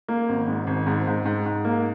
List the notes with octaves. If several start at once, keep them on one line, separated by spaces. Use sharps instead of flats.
A#3
G#1
G#2
G#1
G#2
G#2
G#2
G#2
A#3